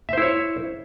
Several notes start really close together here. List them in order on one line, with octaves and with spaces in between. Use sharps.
E5 C5 E4 C#5